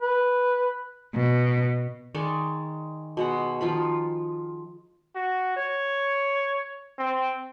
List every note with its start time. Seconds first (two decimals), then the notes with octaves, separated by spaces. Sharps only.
0.02 B4
1.15 B2
2.15 D#3 G#3 D5 C#6
3.17 B2 G#3 F#5
3.61 D#3 F3 F4 B5
5.15 F#4
5.56 C#5
6.98 C4